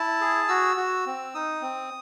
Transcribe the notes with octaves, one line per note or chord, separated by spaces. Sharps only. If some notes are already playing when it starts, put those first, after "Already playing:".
Already playing: E4 A5
G#4
F#4 E6
F#4
C4
D#4 D#6
C4